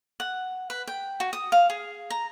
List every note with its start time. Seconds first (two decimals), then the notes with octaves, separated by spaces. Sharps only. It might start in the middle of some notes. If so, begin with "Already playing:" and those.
0.20 F#5
0.70 B4
0.87 G5
1.20 F#4
1.33 D#6
1.52 F5
1.70 G#4
2.10 A#5